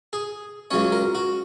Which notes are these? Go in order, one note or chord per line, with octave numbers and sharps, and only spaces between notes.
G#4
C#2 C#3 F#3 C#4 C#5
A#4
F#4